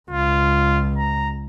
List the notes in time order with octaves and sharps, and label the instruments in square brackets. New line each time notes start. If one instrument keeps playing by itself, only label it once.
[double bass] C#2 [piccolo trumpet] F4
[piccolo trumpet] A#5